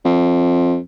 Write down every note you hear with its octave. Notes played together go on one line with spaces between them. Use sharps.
F2